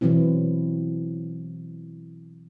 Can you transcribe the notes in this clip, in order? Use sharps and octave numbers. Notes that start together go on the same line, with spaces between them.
B2 E3 F#3 C4 E4